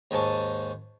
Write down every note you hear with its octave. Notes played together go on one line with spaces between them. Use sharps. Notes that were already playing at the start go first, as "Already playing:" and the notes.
D#2 G#2 G#5 A5 C#6